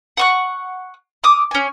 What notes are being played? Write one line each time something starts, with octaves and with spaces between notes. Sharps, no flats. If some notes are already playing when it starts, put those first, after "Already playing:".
F#5 C#6 F#6
D6 D#6 F6
C#4 G#5